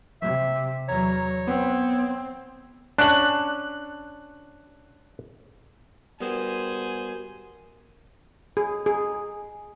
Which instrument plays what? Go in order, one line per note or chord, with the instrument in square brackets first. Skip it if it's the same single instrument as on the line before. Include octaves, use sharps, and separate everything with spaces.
[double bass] C3 [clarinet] E5
[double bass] E2 F#3 [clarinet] C#5 [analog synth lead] A#5
[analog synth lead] B3 [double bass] C4
[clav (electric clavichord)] C#4 D4 [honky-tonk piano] F#6 F#7
[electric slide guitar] G3 B3 [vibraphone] F#4 A#4 [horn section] G#4 C5 G#5
[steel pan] G#4
G#4